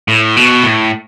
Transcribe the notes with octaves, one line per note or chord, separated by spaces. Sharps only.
A2
B2
A2